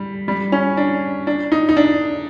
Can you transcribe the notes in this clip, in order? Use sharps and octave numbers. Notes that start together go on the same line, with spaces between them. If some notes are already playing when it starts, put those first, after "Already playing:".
Already playing: G3
G3
C#4
D4
D4
D#4
D#4
D4